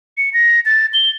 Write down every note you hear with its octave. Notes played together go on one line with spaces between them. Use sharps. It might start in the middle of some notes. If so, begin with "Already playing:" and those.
C#7
A#6
A6
G7